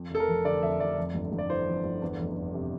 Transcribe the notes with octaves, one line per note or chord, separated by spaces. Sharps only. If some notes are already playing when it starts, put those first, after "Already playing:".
Already playing: F2
F1 A4
A#4
F1
D3 D5
F2 E5
F1 D5
F2
G1
G1
D5
E3 C5
F2
G1
E2
F1
F1
C3